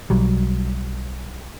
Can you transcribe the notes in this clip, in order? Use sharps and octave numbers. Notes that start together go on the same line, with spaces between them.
B1 F#3 G3